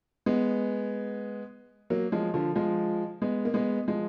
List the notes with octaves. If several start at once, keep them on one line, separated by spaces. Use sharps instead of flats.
G#3 B3
F#3 A#3
F3 G#3
D3 F3
F3 G#3
G#3 B3
A#3
G#3 B3
F3 G#3